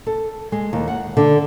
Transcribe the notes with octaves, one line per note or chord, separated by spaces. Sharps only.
A4
G#3
D#2
F#5
D3